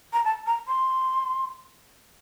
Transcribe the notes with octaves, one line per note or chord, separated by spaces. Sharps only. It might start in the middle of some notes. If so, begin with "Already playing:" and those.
A#5
A5
A#5
C6